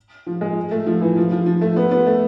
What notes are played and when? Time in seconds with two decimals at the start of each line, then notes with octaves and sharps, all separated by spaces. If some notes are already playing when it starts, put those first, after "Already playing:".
0.27 F3
0.41 G#3
0.71 A3
0.86 F3
1.01 E3
1.17 F3
1.31 F3
1.46 F3
1.61 A3
1.76 B3
1.91 B3
2.06 A3